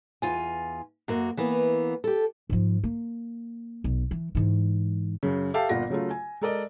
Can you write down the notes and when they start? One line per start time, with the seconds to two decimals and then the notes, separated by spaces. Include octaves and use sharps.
0.22 E2 F4 G#5
1.08 F#2 A#3 F#4
1.37 E3 A#3 B3
2.04 G4 A4
2.50 G#2 F3
2.84 A#3
3.84 B1
4.11 E3
4.35 G#2 E3
5.23 F#2 C#3
5.54 G4 A4 E5 F5 G5 A5
5.69 G1 A#2 F4 F#5 A#6
5.90 C#3 F#3 A3 F4
6.11 G#5
6.41 G#3 A4 A#4 D5 D#5